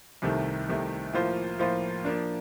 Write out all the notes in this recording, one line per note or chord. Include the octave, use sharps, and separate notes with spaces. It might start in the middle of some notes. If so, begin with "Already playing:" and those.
C2 C3 D#3 A3
C2 C3 D#3 A3
A2 F3 A#3 F4 C5
A2 F3 A#3 F4 C5
F3 A#3 D4